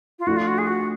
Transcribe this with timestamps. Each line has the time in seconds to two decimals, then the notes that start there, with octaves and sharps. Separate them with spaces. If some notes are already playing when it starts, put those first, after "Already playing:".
0.19 F4
0.27 F3 A3 D4 F#4
0.37 F4
0.48 F#4
0.58 G#4
0.67 F#4